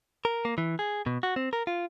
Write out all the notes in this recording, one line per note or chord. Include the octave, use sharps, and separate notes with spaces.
A#4
A#3
E3
G#4
B2
F#4
C4
A#4
F4